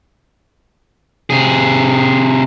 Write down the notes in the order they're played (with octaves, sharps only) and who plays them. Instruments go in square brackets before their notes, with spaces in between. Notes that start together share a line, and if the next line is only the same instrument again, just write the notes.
[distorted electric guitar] C3 G#4